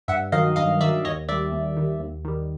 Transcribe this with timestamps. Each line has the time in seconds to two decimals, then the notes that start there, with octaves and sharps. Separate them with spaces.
0.08 G2 E5 F#5
0.32 D#3 F#3 D#5 F5
0.56 G2 D#5 F5
0.81 D#3 F#3 D5 E5
1.05 D#2 C#5 D#5
1.29 D#3 G3 D5 E5
1.52 D#2
1.77 D#3 G3
2.00 D#2
2.25 D#3 G3